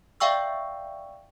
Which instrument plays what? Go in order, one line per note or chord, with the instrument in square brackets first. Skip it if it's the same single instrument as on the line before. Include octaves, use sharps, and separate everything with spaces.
[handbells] D5 E5 F5 G5 C#6 E6